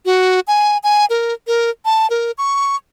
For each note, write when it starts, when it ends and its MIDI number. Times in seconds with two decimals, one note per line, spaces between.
0.05 0.40 66
0.47 0.78 80
0.83 1.05 80
1.10 1.33 70
1.47 1.70 70
1.85 2.09 81
2.10 2.31 70
2.38 2.76 85